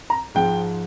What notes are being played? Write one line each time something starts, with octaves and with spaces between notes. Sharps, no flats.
A#5
G#2 F3 G#3 G5